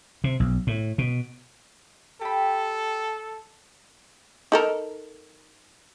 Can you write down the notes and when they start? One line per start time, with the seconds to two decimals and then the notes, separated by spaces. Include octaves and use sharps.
0.24 C3
0.40 B1
0.67 A2
0.98 B2
2.21 G4 A4 B5
4.52 D#4 A4 A#4